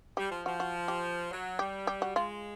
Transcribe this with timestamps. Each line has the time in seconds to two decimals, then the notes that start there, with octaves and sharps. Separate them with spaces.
0.17 G3 G4
0.31 F3
0.46 F3 F#4
0.60 F#4
0.88 G4
1.31 F#3
1.59 G3 G4
1.87 G4
2.02 F#4
2.15 G#3 F4